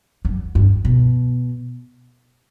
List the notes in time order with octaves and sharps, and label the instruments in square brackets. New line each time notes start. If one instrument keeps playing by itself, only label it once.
[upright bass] F#2
G2
B2